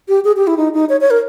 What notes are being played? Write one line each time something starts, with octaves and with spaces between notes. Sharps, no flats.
G4
G#4
G4
E4
D#4
D#4
C#5
C#5
A#4